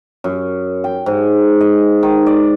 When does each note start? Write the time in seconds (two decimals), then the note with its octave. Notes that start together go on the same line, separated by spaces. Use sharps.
0.24 F#2
0.84 G5
1.06 G#2
1.61 D#5
2.03 D#3
2.26 D5